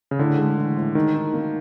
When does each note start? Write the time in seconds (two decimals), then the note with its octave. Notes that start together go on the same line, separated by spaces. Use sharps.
0.11 C#3
0.19 A2 D3
0.38 G#3
0.57 E3
0.77 A2
0.95 D#3 D#4
1.14 D#4
1.34 A#3